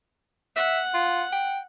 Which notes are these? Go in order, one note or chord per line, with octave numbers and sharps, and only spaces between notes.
E5 F#5
F4
G5